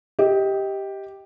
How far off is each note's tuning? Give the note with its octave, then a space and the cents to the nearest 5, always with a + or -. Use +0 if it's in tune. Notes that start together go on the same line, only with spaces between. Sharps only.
G4 +0 D#5 +25